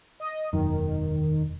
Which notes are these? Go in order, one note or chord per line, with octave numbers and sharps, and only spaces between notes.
D#5
E1 F#2 D#3